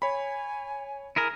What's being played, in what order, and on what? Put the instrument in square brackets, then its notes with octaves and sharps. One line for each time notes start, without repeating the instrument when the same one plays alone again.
[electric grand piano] C#5 B5 [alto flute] G#5
[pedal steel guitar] E4 G#4 A#4